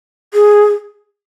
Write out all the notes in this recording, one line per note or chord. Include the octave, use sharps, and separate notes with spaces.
G#4